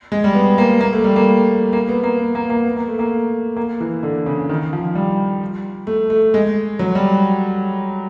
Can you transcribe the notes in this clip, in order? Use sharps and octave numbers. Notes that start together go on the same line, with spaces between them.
G#3
G3
B3
A#3
A#3
A3
G3
A#3
A#3
B3
A#3
B3
A#3
A#3
B3
A#3
A3
A#3
A#3
E3
D3
C#3
D#3
F3
G3
A3
A3
G#3
F#3
G3